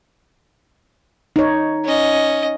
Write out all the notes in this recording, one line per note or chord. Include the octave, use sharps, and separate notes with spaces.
D#4 C#5
C#4 D#5